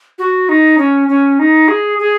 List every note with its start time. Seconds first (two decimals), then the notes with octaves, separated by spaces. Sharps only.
0.18 F#4
0.49 D#4
0.78 C#4
1.09 C#4
1.39 D#4
1.68 G#4
1.99 G#4